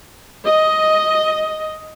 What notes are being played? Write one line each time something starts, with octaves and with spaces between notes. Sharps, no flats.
D#5